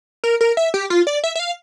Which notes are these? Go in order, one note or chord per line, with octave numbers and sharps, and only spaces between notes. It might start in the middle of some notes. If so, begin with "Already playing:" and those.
A#4
A#4
E5
G4
F4
D5
E5
E5
F5